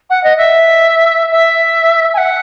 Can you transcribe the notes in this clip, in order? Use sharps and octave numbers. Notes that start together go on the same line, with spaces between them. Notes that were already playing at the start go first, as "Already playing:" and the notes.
F#5
D#5
E5
E5
G#5
F#5